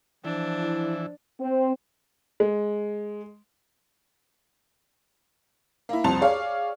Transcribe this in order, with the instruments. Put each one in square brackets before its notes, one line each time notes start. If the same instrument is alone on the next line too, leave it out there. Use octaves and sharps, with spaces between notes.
[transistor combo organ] E3 [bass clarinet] F3 [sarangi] D4
[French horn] E4
[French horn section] C4
[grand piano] G#3
[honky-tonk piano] A#3 E4
C2 F2 C4 A5 C6 F7
G#4 C#5 D5 F5